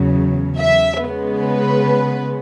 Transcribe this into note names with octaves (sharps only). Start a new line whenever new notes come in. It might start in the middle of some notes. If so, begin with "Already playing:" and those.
Already playing: E2 C#3 F#3
E5
C#3 G#3 B3
B4